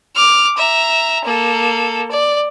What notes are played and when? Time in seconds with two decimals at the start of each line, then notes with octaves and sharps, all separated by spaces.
0.16 D6 F6
0.58 E5 A#5
1.25 A#3 A4
2.11 D5